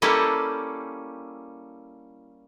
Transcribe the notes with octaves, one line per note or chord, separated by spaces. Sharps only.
G3 A#3 C#4 E4 G4 A4